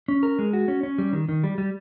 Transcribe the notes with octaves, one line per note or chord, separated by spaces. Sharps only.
C#4
A#4
G#3
F#4
C#4
C#4
G3
D#3
D#3
G3
G3